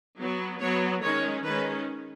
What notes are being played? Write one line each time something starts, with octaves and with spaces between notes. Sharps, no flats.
F#3 B3
F#3 B3 C#5
D#3 G#3 C#4 C#5
D#3 G#3 C#4 B4